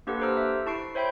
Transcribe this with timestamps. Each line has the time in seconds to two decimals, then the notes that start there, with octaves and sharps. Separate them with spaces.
0.07 A#3 D4 G4 A4 B4 F#5
0.20 G4 A4 C5 A#5 E6 F6
0.37 E5
0.66 E4 A5 C#6 C7 D7
0.95 C5 C#5 E5 G5 B5 G6